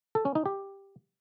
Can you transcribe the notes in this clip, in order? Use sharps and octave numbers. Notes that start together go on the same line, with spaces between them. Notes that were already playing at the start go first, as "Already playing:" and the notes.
A4
C#4
D#4
G4